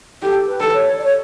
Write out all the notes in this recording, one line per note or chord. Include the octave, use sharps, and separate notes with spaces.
G4 A4
B4
A4
C#5
D5
C#5